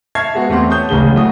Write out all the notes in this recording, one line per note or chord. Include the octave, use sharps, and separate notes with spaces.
E5 A5 C#6 F6 G#6 C7
G#3 B3 F#4
E2 A3 C4 G4 F#5 C6
C#5 A5 C#6 D#6 G6
D1 A1 C#3 G#3 G7
F#3 A3 F#4 G#4 D#6